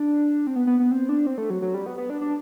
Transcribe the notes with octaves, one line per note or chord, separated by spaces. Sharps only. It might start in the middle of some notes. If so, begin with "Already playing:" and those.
Already playing: D4
C4
B3
B3
B3
C4
D4
C4
A3
F#3
F#3
G3
B3
B3
D4
D4